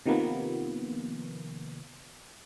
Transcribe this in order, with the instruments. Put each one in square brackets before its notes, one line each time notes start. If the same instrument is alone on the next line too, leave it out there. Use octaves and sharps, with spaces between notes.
[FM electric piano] C3 D#3 F3 A#3 B3